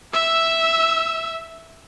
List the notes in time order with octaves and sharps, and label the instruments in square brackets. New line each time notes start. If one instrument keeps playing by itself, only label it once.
[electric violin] E5 E6